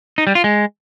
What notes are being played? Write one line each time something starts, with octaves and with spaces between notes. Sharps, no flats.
D#4
G3
F4
G#3